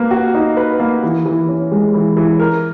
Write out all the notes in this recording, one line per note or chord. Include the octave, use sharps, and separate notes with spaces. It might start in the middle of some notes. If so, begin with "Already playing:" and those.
Already playing: A#3 B4
F#4
D#4
B4
A#3
E3
E3
C#4
G#3
E3
E3
A#4